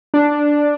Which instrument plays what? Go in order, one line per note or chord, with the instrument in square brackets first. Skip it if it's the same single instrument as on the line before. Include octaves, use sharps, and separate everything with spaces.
[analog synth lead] D4